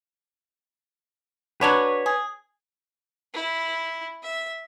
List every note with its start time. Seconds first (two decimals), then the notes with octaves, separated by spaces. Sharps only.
1.61 F#3 D4 F#4 B4 C#5
2.06 G#4
3.34 E4
4.23 E5